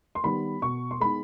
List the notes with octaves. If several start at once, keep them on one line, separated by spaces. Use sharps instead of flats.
C6
D#3 G3 B3 B5
B2 C#6
C6
G#3 B3 D#4 B5